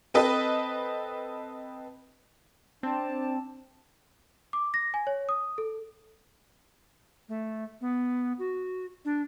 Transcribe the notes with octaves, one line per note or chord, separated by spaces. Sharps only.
C4 A4 B4 D#5
C4 D4 D5 A5
D6
A#6
G#5
C#5
D#6
A4
A3
B3
F#4
D4